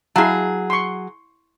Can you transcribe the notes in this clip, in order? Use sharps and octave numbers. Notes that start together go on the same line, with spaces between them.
F#3 E4 G#4 F5 A5
C6 C#6